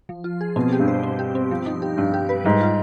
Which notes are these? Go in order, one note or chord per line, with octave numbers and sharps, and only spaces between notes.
F3
F4
G#4
B2 C4
G4
G2
C5
C4
G4
C4
F3
D#4
G4
G2 G3
G4
B4
G#2 G3
F4